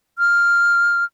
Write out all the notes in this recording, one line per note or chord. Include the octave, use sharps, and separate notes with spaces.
F6